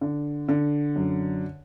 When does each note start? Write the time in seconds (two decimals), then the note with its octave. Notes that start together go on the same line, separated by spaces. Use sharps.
0.01 D3
0.48 D3
0.96 F#2